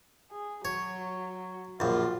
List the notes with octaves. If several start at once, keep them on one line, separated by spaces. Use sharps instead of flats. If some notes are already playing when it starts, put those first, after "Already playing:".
G#4
F#3 C#5
A#1 F#2 F4